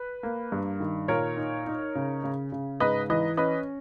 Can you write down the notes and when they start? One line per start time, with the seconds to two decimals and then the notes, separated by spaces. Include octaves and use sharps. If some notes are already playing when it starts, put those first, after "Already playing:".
Already playing: B4
0.23 A#3
0.52 G2
0.80 D#3
1.08 A#2 A#4 C#5
1.37 D#4
1.67 D#4
1.95 C#3
2.24 C#3
2.52 C#3
2.80 G#2 B4 D#5
3.10 E3 B4 D#5
3.37 C#4 B4 D#5